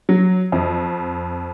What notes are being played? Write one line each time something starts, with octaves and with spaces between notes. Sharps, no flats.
F#3
F2